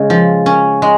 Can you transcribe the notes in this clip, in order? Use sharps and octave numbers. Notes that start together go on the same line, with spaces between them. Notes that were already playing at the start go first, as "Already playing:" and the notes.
Already playing: C#3 G#3
F3
C#4
G#3